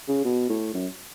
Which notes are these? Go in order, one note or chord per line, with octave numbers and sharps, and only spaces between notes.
C#3
B2
A2
F#2